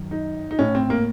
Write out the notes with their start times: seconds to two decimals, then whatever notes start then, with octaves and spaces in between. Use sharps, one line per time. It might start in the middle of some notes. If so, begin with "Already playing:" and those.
Already playing: F#2 D#3
0.11 D#4
0.51 D#4
0.59 A2 C#4
0.75 C4
0.90 A#3